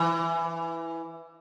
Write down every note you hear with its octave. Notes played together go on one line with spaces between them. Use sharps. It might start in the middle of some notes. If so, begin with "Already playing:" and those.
Already playing: E3